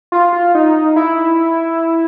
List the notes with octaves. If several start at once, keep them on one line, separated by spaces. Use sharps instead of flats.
F4
F4
D#4
E4